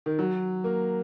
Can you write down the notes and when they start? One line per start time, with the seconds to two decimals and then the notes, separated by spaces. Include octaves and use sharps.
0.06 D#3
0.19 F#3
0.64 A#3